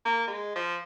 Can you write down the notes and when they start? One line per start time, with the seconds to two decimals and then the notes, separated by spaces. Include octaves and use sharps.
0.05 A#3
0.28 G#3
0.56 F3